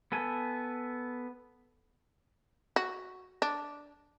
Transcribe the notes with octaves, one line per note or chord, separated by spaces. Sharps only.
B3 A4 G#5
F#4
D4